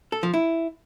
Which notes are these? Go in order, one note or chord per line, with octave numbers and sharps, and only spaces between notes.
A4
F3
E4